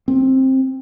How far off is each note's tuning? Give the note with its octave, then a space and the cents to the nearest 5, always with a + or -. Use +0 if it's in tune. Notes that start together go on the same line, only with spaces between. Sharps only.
C4 +15